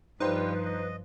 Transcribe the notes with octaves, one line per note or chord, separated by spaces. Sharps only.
G2 F3 G3 D#4 F4 G4 B4 C5
D#5